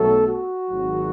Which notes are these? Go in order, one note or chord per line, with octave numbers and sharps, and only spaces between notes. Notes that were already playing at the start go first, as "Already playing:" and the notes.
Already playing: B1 B2 F#3 A3 A4
F#4
G#1 G#2 F#3